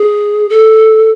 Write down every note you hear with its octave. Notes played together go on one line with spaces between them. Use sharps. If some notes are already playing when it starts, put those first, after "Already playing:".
Already playing: G#4
A4